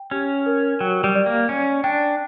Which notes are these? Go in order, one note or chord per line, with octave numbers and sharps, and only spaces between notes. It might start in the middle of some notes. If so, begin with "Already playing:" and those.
Already playing: G5
C#4 G4
A#4
F#3 G5
G3
D5
A#3
C#4 D5
D4 G5